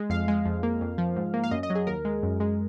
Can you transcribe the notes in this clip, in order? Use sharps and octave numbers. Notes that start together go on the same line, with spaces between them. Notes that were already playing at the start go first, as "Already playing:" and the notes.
Already playing: G#3
F2 F5
G#3
F2
A#3
F2
F3
G#2
A#3
F5
F#2 D#5
D#5
F#3
G#4
D#2 A#4
G#3
F#2
G#3